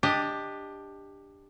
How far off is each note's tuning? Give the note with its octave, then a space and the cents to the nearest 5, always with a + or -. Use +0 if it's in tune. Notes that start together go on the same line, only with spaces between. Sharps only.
D4 +0 G4 +15 D#5 +0